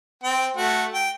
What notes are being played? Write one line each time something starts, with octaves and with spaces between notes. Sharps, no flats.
C4 G5
A3 F#4
G5